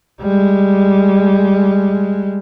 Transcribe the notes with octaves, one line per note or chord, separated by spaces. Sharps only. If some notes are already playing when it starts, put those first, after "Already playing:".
G3 G#3